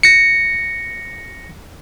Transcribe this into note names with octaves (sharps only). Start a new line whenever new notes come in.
A#6 C#7